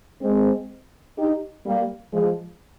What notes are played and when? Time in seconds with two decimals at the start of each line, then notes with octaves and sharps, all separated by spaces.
0.22 G#3 C4
1.18 D#4 G4
1.66 G3 A#3
2.13 F3 G#3